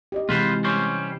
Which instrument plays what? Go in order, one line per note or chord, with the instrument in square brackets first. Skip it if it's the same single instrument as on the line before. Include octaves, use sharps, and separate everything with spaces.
[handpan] G4 D5 D#5
[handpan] C3 E3 [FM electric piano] G#3 [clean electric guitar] F4 B4 C5
[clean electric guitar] G3 C#4 C5